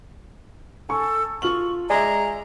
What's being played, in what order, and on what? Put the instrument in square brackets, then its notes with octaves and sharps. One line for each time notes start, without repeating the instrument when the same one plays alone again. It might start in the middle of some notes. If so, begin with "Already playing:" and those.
[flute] A4 [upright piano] G#5 C#6
[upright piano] F4 F6 F#7 [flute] C#6
[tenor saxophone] G#3 [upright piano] D5 E5 [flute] A#5